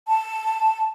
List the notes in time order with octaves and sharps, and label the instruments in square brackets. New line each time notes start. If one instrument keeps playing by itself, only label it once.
[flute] A5